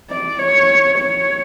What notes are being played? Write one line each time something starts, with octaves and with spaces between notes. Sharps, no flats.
D5
C#5
C#5